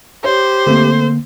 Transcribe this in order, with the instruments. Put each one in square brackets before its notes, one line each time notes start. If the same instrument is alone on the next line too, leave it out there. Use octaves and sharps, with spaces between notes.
[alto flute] G4 [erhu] C5 [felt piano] C#5
[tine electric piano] D3 A#3 [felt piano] A3 C4